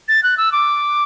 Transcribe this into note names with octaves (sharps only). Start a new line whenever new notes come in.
A6
F#6
E6
D6